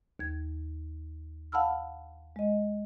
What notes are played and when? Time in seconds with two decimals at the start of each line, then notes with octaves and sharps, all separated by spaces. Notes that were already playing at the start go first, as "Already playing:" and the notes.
0.19 D#2 G#6
1.52 F5 F#5 A5 B5 E6 F6
2.36 G#3 D#5